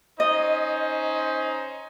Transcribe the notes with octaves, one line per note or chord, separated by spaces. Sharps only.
C#4 D#4 C5 D#5